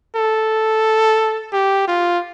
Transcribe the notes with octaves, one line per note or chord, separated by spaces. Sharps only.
A4
G4
F4